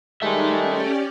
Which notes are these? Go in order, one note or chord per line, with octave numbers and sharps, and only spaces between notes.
D#3 G3 G#3 D#4 A4 E5
C#4 G4 D5